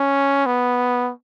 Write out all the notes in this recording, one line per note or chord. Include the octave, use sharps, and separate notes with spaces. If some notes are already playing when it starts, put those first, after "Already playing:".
Already playing: C#4
B3